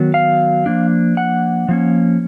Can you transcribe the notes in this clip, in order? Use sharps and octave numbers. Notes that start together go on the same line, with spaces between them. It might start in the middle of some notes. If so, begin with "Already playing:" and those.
Already playing: D#3 F#3 B3
F5
F3 A#3 D4
F#5
F3 A#3 C#4